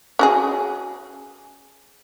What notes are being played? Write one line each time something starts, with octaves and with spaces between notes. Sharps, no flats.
C#4 F#4 G#4